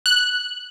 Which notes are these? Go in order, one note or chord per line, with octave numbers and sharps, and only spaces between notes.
F#6